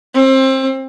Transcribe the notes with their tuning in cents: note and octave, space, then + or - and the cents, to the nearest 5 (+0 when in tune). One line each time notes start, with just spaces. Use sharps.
C4 +25